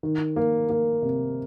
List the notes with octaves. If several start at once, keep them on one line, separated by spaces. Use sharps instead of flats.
D#3
A#3
A#3
C3